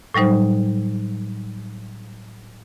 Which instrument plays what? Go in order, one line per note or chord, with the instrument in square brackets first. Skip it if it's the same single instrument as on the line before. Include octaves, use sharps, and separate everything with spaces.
[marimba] A2 F#3 G3 D#4 C5